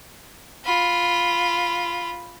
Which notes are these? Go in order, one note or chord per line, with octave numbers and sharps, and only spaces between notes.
F4 B5